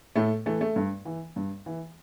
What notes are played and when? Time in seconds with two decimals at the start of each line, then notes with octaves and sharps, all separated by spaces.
0.15 A2 A3
0.46 E3 A3
0.61 A3
0.76 G2
1.05 E3
1.36 G2
1.66 E3